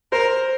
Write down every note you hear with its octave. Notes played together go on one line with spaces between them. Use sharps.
A#4 C5